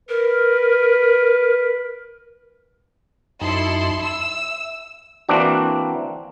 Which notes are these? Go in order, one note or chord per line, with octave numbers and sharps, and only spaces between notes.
A#4 B4
F#2 D#4 E4 A4 C6
E5 E6
E3 A#3 C4 D4 F#4